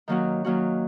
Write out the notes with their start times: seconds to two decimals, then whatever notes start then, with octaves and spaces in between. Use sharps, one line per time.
0.08 D#3 F#3 A#3 C#4 F#4
0.45 D#3 F#3 A#3 C#4 F#4